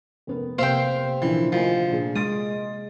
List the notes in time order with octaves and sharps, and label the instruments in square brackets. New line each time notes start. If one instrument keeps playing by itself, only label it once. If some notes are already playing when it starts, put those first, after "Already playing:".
[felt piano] F1 B3 A#4
[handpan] C3 A#3 [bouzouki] C5 G5 [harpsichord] E5 F5
[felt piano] A#2 D3 F3 [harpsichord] E3
[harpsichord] D2 F3 [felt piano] A#4 D#5 G#5
[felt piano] A#2 D4 G#4
[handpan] G#3 [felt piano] C6 A6 D7 [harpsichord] D#6